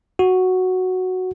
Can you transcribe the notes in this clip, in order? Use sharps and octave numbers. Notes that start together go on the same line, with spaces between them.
F#4